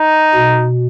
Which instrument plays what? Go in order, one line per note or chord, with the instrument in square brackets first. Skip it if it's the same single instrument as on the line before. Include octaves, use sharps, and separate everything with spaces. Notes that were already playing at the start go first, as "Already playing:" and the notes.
Already playing: [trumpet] D#4
[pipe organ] B2